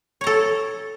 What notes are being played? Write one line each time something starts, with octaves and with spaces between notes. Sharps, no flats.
A4 C#5 A#5